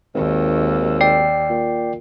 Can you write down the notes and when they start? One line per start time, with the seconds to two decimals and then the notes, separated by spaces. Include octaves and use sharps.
0.15 G#1 D#2
1.01 D5 G5 C7
1.50 A#2